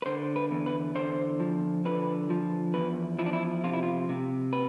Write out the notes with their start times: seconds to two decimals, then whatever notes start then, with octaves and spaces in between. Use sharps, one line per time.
0.02 B4
0.06 D3 C5
0.36 B4
0.51 E2
0.66 B4
0.95 D3 C5
1.40 F3
1.85 D3 B4
2.30 F3
2.74 E2 B4
3.19 F3 E4
3.26 D4
3.33 E4
3.64 C3 F4
3.73 E4
3.83 F4
4.09 C3
4.53 B4